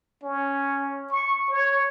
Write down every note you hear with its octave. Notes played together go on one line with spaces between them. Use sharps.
C#4
C#6
C#5